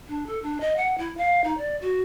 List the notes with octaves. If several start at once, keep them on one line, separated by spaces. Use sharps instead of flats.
D4
A4
D4
D#5
F#5
E4
F5
D#4
D5
F#4